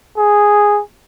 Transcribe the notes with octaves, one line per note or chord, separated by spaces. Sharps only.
G#4